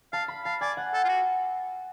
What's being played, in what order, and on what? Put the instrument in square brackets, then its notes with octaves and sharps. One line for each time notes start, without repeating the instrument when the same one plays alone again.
[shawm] F5 [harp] A5
[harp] B5
[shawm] F5 [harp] A5
[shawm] D5 [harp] G#5
[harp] F#5
[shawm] A4
F4
F#4